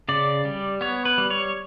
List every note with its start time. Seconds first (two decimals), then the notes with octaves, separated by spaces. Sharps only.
0.09 C#3 D5
0.45 G3
0.81 B3 C#5
1.05 B4
1.18 G3
1.30 C#5